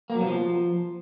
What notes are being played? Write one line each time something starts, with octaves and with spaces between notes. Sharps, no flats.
A#3
F#3
B2
F3